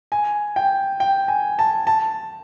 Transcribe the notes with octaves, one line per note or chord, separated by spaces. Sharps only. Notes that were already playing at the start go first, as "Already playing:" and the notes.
G#5
G5
G5
G#5
A5
A5